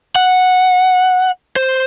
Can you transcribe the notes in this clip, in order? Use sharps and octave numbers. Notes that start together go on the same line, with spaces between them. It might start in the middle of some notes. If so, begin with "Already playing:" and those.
F#5
C5